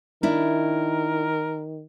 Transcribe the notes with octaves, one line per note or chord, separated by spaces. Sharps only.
D#3 D4 E4 A#4